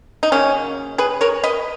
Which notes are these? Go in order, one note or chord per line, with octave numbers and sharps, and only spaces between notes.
D#4
C#3 F#3 A#3 C#4
G#4 B4
A#4 C#5
B4 D#5